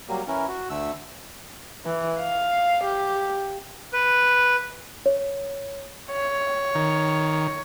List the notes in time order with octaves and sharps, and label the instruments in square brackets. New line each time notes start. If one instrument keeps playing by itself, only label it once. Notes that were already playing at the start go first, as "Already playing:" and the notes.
[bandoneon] F#3 G3 A#3
E3 C#4 E4 A#4
F#4
D2 D3 A3 E6
[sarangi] E3
F5
G4
[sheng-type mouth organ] B4
[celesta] C#5
[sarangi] C#5
[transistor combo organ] D#3